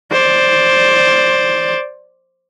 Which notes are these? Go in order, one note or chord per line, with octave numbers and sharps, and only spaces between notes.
C5 D5